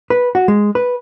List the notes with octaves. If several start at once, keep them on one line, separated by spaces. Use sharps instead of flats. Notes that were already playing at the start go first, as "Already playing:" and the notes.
B4
F#4
G#3
B4